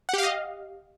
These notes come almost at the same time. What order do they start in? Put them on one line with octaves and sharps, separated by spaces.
F#5 G4 F5 D#5